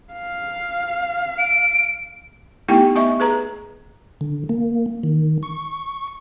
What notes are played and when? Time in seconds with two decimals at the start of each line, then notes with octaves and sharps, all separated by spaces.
0.13 F5
1.39 D7
2.68 A3 B3 D#4 E4 G4 G5
2.95 B3 D#5 E5 C#6
3.20 G#4 B4 A#5
4.21 D3
4.49 A#3
5.03 D#3
5.43 C#6